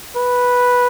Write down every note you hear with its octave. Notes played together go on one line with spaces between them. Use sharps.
B4